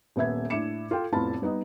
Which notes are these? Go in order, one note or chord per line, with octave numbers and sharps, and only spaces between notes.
D#1 B3 E5 G#6
A2 D4 E5 D6 C#7 E7
F4 A4 G5
F1 A2 B3 F4 A5 B5
G3 B3 D#4 D#5